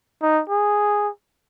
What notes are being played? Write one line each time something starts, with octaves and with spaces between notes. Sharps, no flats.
D#4
G#4